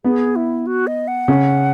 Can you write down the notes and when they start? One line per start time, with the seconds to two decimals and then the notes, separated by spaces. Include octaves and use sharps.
0.04 B3 G#4
0.36 E4
0.67 F#4
0.87 D#5
1.08 F#5
1.28 C#3